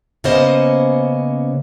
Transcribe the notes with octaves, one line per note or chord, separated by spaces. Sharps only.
C#3 A#3 B3 C#4 C5 D#5